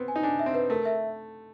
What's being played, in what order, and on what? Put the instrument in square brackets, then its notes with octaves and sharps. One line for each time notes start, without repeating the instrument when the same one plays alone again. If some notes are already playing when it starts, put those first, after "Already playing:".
Already playing: [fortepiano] B3 C4
[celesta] G#5
[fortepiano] D#4
[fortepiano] D4 [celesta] G#5
[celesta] E5
[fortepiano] C4
[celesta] B4
[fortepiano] A3 [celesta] A#4
[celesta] E5